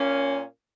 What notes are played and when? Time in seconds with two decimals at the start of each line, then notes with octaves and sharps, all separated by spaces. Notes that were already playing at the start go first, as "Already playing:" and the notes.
Already playing: A#2 A#3 C#4